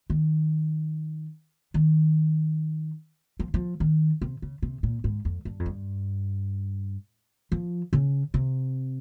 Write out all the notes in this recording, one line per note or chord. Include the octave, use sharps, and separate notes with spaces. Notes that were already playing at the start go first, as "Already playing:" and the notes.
D#3
D#3
F3
F3
D#3
C3
C#3
C3
A#2
G#2
F2
G2
F2
G2
F3
C#3
C3